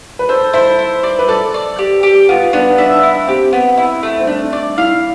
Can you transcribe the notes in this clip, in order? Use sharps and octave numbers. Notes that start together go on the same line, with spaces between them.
B4
A4 C5
E4 C5
E4
D5
B4
A4 D5
D5
G4
G4
B3 F4
B3 D4
D4 E5
E4
C4 G4
B3
E4
A3
C4
A3 D4
D4 D5
E4 F5